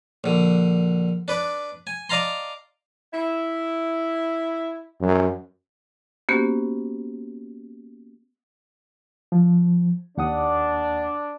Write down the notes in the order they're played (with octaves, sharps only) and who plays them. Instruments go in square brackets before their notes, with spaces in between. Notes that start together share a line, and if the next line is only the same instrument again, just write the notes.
[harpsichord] A#1 D3
D4 B4 D5
G#5
D5 D#5 F5 A5 A#5 C6
[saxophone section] E4
[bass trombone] F#2
[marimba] A#3 B3 C#4 F#4 G4 C5
[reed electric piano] F3
[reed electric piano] D#2 F#5 D#6 [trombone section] D4